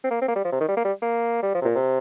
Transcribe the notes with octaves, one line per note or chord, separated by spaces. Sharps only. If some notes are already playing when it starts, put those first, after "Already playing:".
C4
A#3
C4
A#3
G3
F3
C3
D#3
G3
A#3
G3
A#3
G3
F3
C3
A#2
C3